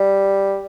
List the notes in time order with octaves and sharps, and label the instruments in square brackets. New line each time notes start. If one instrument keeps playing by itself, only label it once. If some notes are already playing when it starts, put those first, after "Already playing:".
Already playing: [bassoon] G3